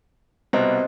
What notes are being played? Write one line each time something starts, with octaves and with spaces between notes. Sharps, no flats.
C2 B2 C4 C5 D#5